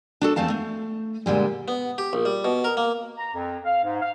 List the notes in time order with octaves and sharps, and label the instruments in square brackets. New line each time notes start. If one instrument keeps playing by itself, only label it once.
[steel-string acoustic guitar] D4 F#4 A4
E2 A3 C4 F5 A5
A3
A#2 D3 G3 G#3
[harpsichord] B3
G4
A#1
G3
B2
A#4
A#3
[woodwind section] A#5
F2
F5
G#2
F5